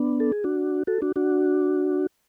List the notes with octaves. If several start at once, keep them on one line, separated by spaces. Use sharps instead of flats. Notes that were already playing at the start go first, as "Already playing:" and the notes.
Already playing: B3 D4
A4
G#4
D4 F#4
F#4 A4
D4 F#4
D4 F#4